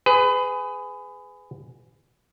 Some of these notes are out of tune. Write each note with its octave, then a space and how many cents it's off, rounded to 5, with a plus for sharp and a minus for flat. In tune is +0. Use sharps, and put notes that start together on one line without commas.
G#4 +0 B4 +25